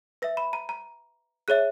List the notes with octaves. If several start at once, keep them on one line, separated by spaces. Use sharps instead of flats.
B4 E5 A#6
B5
A#5
A#5
G#4 C#5 E5 F#6